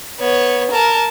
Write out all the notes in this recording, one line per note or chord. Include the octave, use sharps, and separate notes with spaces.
B3 C#5
A#4 A5